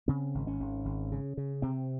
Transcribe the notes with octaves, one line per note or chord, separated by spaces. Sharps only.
C#3 C4
G#1
C#4
G#1
G#1
C#3
C#3
C3 C4